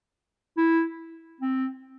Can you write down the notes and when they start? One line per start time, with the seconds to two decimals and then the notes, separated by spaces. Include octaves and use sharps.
0.57 E4
1.41 C4